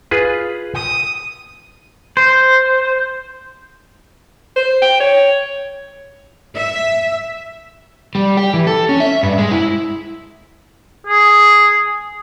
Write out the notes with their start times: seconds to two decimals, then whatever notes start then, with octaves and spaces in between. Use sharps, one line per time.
0.11 F4 G#4 B4
0.75 D#6
2.17 C5
4.56 C5
4.82 G5
5.00 C#5
6.56 E5
8.15 G3
8.37 G4
8.54 E3
8.67 A4
8.89 C#4
9.00 E5
9.23 G2
9.38 G#3
9.51 E4
11.07 G#4